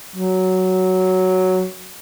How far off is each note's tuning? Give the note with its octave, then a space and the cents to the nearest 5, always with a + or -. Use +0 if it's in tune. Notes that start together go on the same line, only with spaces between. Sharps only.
F#3 +5